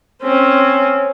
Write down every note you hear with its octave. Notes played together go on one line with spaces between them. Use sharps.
C4 C#4